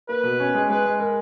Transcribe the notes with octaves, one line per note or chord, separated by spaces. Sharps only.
A#3 B4
B2
C#4
G#3
G#3 B4
G#3
A#4